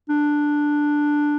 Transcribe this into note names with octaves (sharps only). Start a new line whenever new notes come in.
D4